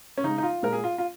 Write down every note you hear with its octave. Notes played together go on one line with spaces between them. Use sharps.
C#4
C#3 G#3 D#4
D#4
F4
A#2 G#3 A#4
G#4
F4
F4